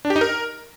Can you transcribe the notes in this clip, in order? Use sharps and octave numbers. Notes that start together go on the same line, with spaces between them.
D4
G4
D#4
A#4